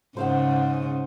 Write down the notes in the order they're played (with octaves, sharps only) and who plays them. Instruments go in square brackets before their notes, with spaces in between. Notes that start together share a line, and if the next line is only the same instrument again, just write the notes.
[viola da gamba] G#2 C#3 [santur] C5 F5 F#5